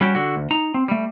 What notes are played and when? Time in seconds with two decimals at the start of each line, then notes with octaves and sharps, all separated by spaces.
0.01 G3 C#4 F#4 G4
0.15 D3 F#4
0.36 D2
0.51 D#4 A#5
0.74 C4
0.88 G3 A3